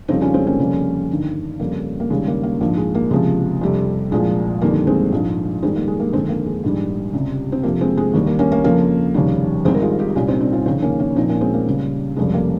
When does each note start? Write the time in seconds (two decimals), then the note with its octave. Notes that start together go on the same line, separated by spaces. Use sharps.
0.08 F2 C#3 G3 C4 D#4
0.22 C#4 F4
0.34 G#3 C4
0.47 A#3 C#4
0.59 F1 F2 C#3 G3
1.09 G1 G2 D#3
1.59 F2 C#3 G3 A#3
2.00 A#3
2.10 D#2 C#3 G3 G#3
2.27 A#3
2.43 A#3
2.60 A#1 G#2 F3 A#3
2.77 G#3
2.95 A#3
3.10 C#2 C3 F3 G#3
3.61 F2 C3 G3
4.11 C2 A#2 F3 G#3
4.61 G1 F2 D#3 G3 A#3
4.87 G#3 C4
5.12 A#1 G#2 F3
5.62 F2 D#3 G3 G#3 C4
5.75 A#3
5.88 G#3
6.00 A#3
6.13 G1 F2 D#3 G#3 C4
6.29 A#3
6.46 G#3
6.63 A#1 G#2 D#3 G3
7.13 C#2 C3 G3
7.52 C4
7.63 F2 C3 F3 A#3
7.81 G#3 C4
7.97 G#3
8.14 D#2 D#3 G3 A#3
8.27 A#3
8.39 A#3 C#4
8.52 A#3
8.64 F2 C#3 F3 A#3
9.14 F1 D#2 C#3 G3
9.65 G#1 G#2 G3 G#3 C4
9.75 A#4
9.82 F4 G#4
9.99 D#4 G4
10.15 C2 A#2 G3 C#4 F4
10.28 C4 D#4
10.41 C4 D#4
10.53 C#4 F4
10.66 F1 D#2 C#3 C4 D#4
10.82 A#3 C#4
10.99 A#3 C#4
11.16 A#1 A#2 F3 C4 D#4
11.29 A#3 C#4
11.41 G#3 C4
11.54 A#3
11.67 C#2 C#3 G3
12.16 F1 F2 C#3 G3 G#3
12.34 A#3